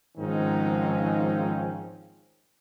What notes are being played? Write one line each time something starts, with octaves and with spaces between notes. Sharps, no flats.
G#2 D#3 F3 C4 C#4 D#4